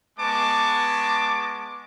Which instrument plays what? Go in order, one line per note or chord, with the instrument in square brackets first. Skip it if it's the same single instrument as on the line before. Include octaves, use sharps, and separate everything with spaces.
[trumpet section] G#3 B3 A5 C#6 D6